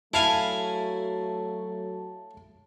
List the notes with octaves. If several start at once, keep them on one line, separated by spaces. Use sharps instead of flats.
F#3 A3 E4 F5 G#5 A5